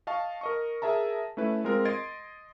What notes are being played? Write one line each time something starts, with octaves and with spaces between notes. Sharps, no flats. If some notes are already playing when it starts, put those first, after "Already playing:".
D#5 F5 A5 C#6
A#4 D#5 C#6
G#4 A#4 E5 A5 A#5
A3 C#4 E4 B4
G#3 C4 F4 A#4
D#5 C6 G#6 A6 C7 D7